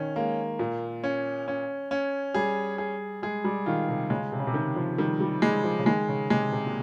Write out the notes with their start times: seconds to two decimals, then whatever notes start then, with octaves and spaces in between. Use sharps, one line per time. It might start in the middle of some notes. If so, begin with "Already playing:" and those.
Already playing: D#3 C#4
0.16 G#3 A#3
0.59 A#2
1.04 C#4
1.48 C#4
1.91 C#4
2.34 G3 G#4
2.78 G#4
3.22 G#3 G#4
3.44 G3
3.66 D#3 F4
3.88 C3
4.10 C#3 G#3
4.32 C3
4.39 C#3
4.47 C3
4.54 D#3
4.76 F3
4.98 D#3 G3
5.20 G3
5.42 G3 G#3
5.64 F3
5.79 C#3
5.86 D#3 G#3
6.08 C#3
6.30 C3 G#3
6.52 C3
6.67 A#2